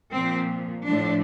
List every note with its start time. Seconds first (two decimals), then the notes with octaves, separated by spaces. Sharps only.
0.12 A#2 F3 C4
0.85 A2 F3 D4